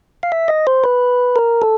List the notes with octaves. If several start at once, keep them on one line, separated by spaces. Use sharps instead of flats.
F5
E5
D#5
C5
B4
A#4
A4